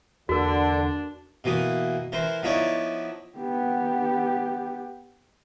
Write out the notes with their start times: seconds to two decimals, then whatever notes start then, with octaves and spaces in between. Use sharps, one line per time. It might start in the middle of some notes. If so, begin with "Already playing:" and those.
0.29 E2 D3 A#3 D4 F#4 A#4
1.44 B2 E3 A#3 D#6
2.12 E3 A#4 C5
2.43 F3 B3 D#4 E4 C#5 D5
3.38 B3 G4